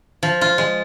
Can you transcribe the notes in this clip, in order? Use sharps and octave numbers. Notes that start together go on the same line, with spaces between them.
F3
F4
G#3